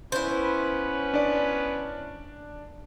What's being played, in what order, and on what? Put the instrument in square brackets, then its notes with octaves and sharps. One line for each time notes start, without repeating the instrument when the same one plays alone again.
[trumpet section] B3 C#4 B4 [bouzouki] E4 C5
[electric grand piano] D4 D5